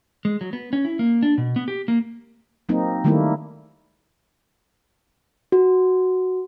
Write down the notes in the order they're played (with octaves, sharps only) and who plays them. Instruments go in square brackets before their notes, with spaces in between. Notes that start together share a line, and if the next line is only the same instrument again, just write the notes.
[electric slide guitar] G#3
F#3
B3
C#4
E4
A#3
D4
B2
B3
G4
A#3
[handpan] F#3 A#3 C4 D#4
D#3 G3 A3 A#3 D#4 E4
[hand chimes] F#4